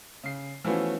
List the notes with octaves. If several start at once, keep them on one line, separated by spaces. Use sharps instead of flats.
C#3 C7
E3 F3 A3 B3 C#4 F#4